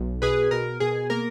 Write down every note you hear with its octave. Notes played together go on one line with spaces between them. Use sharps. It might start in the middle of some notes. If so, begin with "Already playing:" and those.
Already playing: B1
B2 G#4 B4
B2 A#4
B2 G#4
A#3 A#4